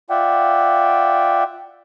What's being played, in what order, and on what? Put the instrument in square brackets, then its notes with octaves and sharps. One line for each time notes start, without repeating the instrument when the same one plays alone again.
[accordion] F4 D5 E5 F#5 G5